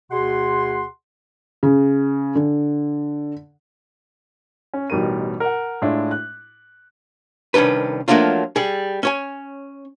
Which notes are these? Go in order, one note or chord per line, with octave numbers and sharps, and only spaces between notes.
D2 B2 G#4 F#5 C6
C#3
D3
C#4
A1 B2 G3 D#4 A#4 D#7
A#4 F#5
A2 G#3 D4 E4 F4
F#6
C2 D#3 C#4 D4 B4
F3 F#3 A3 A#3 D4 F4
G3 G#4
C#4 C#5 G#5